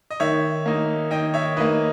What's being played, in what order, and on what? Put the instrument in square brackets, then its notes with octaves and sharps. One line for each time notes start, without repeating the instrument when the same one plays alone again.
[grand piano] D#5
[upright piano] D#3 [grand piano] C#5 E5
[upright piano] A#3 D#4
[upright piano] D#3 [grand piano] D#5 G5
[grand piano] C#5 E5
[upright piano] A#3 D#4 [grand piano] B4 D#5